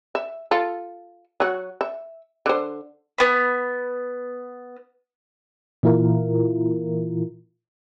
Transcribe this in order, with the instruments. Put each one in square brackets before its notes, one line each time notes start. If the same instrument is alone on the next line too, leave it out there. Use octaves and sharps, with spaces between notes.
[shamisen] E5
F4 A4
F#3 F#4
E5
D3 C5
[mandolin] B3 B5
[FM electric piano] A#2 E3 E4 F4 A#4